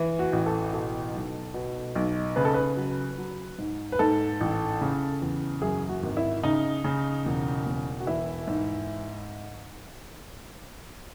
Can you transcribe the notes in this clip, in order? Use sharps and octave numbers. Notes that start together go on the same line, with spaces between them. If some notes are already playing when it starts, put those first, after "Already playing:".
Already playing: E3
F#4
A1
A4
B2 A4
B1
B2
B1
C#3 B4
A4
B4
F#3
F#3
G#2
B4
G#2 A4
A1
C#3
E2
F#2 G#4
F#4
G#1
E4
C#3 D#4
C#3
E1
E1
F#4
E3 E4
G#2